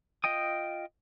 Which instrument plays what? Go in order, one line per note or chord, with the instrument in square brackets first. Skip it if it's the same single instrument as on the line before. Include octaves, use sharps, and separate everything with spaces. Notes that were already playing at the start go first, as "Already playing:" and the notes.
[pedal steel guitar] F4 D#5 G5 D#6